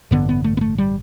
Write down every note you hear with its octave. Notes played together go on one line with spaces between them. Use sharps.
A1 G2 D3 B3
B3
A3
B3
A3
G3